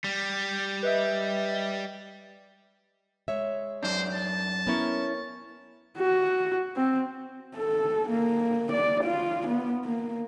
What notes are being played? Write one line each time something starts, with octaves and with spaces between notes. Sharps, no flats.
G3
B4 D#5 E5
G#3 C#5 E5
F#2 D4 C5
A5
B3 C#4 E4 A#4 C#5
F#4
C4
A4
A#3
D5
F4
B3
A#3